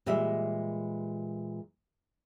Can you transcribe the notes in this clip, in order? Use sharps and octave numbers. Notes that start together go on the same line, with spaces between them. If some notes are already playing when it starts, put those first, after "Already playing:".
A#2 E3 G3 G#3 E5